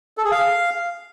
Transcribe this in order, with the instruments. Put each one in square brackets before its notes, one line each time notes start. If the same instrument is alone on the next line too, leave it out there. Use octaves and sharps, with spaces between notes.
[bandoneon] A4
G#4
F5